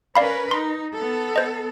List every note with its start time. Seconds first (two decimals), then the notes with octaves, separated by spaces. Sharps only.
0.15 C#4 A#4 B4 D5 F5 B5
0.51 D#4 C6
0.94 B3 A4
1.36 C5 D#5